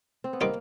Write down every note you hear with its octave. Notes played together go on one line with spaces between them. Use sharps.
C4
B3
D#3 G3 A#3 C4 D#4